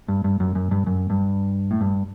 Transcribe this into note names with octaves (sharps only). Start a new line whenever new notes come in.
G2
G2
F#2
F#2
G2
F#2
G2
A2
G2